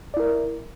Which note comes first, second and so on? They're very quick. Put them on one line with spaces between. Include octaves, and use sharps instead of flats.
D5 E4 A#4